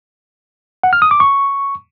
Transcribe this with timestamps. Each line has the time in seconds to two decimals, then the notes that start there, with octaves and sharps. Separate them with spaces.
0.83 F#5
0.93 F6
1.02 D#6
1.11 D6
1.20 C#6